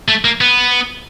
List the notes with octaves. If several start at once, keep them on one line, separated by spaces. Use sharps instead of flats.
A3
A#3
B3